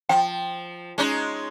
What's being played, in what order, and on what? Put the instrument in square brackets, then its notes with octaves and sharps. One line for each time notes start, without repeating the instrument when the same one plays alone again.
[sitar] F3 [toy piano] G5
[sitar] G#3 C#4 D#4